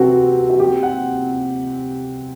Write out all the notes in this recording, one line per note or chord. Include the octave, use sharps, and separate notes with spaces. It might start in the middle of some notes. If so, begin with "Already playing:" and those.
Already playing: C3 C4 F#4 G4 A4 B4
F#4
G4
F#5